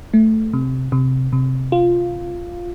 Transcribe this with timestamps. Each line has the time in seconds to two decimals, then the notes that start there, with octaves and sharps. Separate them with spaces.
0.14 A3
0.53 C3
0.92 C3
1.33 C3
1.72 F4